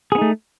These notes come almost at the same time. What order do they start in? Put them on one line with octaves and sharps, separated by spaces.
G#4 B3 D#4 A3